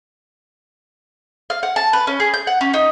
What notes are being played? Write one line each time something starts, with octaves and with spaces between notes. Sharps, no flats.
F5
F#5
A5
B4
C#4
G#4
G6
F#5
C#4
D#4